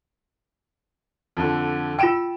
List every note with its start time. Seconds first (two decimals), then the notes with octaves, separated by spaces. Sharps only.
1.37 F2 D3
1.99 F4 G5 E6 D7 E7